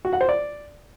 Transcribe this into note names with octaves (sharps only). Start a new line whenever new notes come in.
F#4
F#5
C5
D5